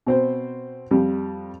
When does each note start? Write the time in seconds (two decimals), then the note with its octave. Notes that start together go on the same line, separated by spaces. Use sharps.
0.07 B2 C4 C5
0.91 F2 G3